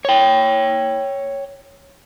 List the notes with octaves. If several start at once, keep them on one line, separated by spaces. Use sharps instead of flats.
C#5 G5